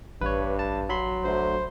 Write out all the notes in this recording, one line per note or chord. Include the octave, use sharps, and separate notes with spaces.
A1 G2 B4 C#5
A5
F#3 B5 C6
D2 C5